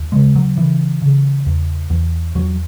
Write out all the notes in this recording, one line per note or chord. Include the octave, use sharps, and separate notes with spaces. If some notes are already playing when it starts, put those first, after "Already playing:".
Already playing: D#2
C#3 G#3
F#3
C#3 E3
C#3
E2
E2
E2 F#3